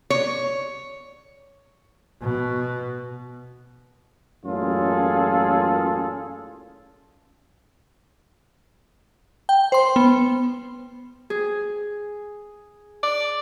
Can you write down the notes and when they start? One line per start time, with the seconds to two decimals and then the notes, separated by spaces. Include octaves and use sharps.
0.10 C#5
2.22 B2
4.44 A1 F#2 A#2 F4 G#4 A4
9.49 G5
9.72 C5 C6
9.96 B3
11.30 G#4
13.03 D5